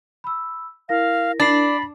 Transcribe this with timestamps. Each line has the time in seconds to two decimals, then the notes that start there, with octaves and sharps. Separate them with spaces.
0.24 B5 E6
0.89 E4 A#4 F5 A#6
1.40 D4 B5 A6 C7